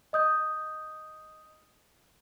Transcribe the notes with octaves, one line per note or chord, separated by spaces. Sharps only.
D#5 D#6 G6